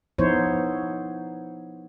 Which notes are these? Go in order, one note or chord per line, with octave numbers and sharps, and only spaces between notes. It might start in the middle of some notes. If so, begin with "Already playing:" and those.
F3 B3 D#4 E4 C5 C#5